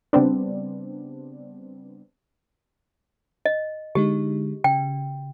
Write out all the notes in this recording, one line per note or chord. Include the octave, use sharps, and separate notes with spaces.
C#3 G3 B3 C4 D4
D#5
D3 G#3 D#4 G4
C#3 G5